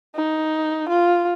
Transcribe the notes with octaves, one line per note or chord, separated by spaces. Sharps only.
D#4
F4